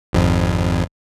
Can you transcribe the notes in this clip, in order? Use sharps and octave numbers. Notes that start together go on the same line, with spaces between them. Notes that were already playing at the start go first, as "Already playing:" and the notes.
G#1 F2